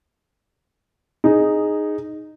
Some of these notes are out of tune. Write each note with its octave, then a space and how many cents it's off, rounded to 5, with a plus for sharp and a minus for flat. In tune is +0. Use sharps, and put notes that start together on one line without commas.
D#4 -10 G#4 +0